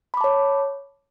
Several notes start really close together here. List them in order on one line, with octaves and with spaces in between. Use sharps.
B5 D6 A5 C#5